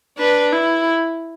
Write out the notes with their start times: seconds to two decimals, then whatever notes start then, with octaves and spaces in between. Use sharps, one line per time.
0.19 D4 B4
0.52 E4